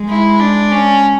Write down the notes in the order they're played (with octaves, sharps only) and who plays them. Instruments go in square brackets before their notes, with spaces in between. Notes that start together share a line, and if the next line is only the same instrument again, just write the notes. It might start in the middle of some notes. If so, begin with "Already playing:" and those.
Already playing: [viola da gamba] G#3
[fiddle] E4
D4
C#4